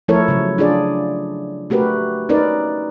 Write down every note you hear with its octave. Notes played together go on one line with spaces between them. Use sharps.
F3 A3 E4 A4 A#4 C#5
C#3 F#3
D4 F4 G#4 D5
A3 F#4 G4 A#4 B4
C#4 D#4 A#4 B4 D5